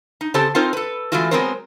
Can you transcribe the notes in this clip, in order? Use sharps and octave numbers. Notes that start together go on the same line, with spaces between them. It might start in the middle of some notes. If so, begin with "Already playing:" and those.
D#4
C#3 C4 G4 A4 C5 A5
C4 D#4 F4 A#4 C5
A4 B4
E3 F3 G#3 A3 F4 F#4
F#3 G#3 B3 C4 A#4 C5